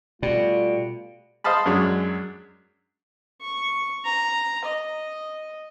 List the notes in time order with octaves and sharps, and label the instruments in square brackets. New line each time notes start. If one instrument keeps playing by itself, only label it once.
[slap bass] B2 [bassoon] G3 [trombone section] A3 F4
[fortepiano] C5 D#5 F5 A5 B5
F#2 F#3 G#3 D4 D#6
[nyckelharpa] C#6
A#5
D#5